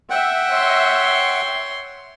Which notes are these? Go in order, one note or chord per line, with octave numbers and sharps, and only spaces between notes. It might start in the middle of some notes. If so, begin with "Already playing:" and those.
E5 F#5 G5
C#5 C6